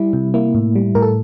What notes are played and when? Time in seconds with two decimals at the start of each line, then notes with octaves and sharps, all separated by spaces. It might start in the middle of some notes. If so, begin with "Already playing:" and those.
Already playing: G3 E4
0.13 C3
0.34 A#3 E4
0.55 A2
0.76 G3
0.95 A2 A#4
1.02 A4